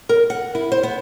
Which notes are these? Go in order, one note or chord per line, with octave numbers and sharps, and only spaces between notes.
A#4
F#5
E4
C5
B3